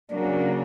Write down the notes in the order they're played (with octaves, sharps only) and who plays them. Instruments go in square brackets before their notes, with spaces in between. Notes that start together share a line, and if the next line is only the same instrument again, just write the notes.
[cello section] C#3 F#3 A#3 [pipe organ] D4